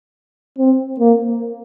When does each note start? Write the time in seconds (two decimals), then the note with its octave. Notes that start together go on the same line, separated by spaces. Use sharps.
0.59 C4
1.00 A#3